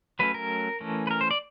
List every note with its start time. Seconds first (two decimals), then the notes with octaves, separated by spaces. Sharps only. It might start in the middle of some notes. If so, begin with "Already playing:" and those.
0.19 F#3 A3 C#4 B4
0.34 A#4
0.80 E3 A3 C#4
1.07 B4
1.11 A#4
1.21 C5
1.31 D5